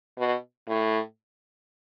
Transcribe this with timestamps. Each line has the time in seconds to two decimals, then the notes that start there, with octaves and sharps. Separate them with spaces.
0.18 B2
0.68 A2